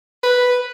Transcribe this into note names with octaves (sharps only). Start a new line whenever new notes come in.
B4